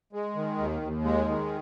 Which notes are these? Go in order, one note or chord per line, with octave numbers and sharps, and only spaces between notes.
G#3
D#3
D#2
D#2
G#3
D#3